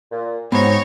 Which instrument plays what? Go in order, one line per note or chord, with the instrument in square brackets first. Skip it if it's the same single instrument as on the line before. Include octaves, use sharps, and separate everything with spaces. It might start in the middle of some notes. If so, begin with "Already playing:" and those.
[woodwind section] A#2
[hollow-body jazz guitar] G#2 [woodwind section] F#3 C4 [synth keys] B3 B5 [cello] D#4 C#5